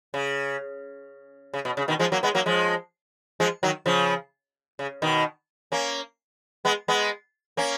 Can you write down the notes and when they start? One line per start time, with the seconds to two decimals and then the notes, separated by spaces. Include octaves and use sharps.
0.14 C#3
1.54 C#3
1.65 B2
1.77 C#3
1.88 B2 D#3
1.99 F3 G#3
2.12 F#3 A#3
2.23 G#3 B3
2.35 F#3 A#3
2.46 F3 G#3
3.40 F3 G#3
3.63 D#3 F#3
3.86 C#3 F3
4.79 C#3
5.02 B2 D#3
5.72 A#3 C#4
6.65 G#3 B3
6.88 G#3 B3
7.57 A#3 C#4